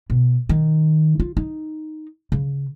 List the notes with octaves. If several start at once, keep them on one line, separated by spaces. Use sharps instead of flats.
B2
D#3
F4
D#4
C#3